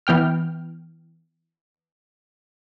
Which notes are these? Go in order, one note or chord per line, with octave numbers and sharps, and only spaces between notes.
E3 B3 G5 F6